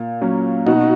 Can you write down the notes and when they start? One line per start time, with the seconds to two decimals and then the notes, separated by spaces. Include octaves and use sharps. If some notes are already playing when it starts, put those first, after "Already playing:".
Already playing: A#2
0.21 F#3 A#3 C#4
0.67 B2 D#4 F#4